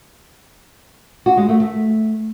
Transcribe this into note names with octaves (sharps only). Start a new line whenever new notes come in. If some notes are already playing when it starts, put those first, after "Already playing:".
F#4
G#3
A3
A3